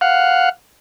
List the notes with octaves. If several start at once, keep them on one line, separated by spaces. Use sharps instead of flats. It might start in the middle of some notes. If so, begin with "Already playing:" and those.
F5 F#5